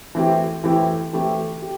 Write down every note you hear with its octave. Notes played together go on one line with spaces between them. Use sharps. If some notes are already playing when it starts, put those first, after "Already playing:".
E3 A3 C4 E4 G4
E3 A3 C4 E4 G4
E3 A3 C4 E4 G4
G4